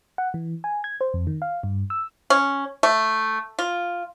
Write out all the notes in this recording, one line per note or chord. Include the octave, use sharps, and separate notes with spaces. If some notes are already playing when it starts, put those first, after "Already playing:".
F#5
E3
G#5
G#6
C5
F2
D#3
F5
G2
E6
C#4
A3
F4